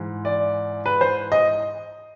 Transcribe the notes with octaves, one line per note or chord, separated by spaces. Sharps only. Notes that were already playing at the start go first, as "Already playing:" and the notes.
Already playing: G#2 E3
D5
B4
C5
D#5